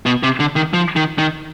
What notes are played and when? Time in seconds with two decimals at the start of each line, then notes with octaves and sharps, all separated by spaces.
0.06 B2
0.23 C3
0.40 D3
0.56 D#3
0.74 F3
0.96 D#3
1.18 D#3